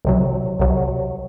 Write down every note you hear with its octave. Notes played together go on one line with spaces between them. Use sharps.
C2 C3 F#3
C2 C3 F#3